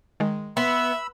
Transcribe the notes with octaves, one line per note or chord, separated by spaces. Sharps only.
D#3 G#3
B3 E5 B5 C6 E6